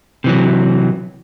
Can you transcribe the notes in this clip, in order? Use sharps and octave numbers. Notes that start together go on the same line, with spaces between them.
C3 E3 F#3